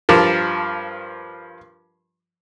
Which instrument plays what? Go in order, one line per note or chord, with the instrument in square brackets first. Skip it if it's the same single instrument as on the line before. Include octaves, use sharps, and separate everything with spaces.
[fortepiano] G2 F3 A#4 A5